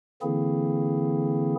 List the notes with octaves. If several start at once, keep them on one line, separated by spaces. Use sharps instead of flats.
D3 E3 A#3 C4 E4 G#4